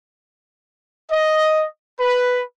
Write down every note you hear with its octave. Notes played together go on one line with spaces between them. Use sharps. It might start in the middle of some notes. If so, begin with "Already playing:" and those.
D#5
B4